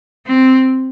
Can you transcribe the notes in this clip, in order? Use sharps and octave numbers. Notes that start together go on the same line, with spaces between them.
C4